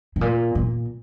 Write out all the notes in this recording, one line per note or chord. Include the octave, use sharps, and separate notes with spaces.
A2
A#2
A#2